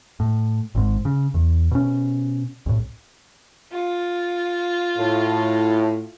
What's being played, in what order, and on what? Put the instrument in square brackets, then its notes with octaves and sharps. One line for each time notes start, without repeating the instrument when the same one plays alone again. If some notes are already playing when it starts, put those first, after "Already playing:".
[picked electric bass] A2
G#1 G#2
C#3
E2
B2 C#4
C2 A2
[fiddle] F4
[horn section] A2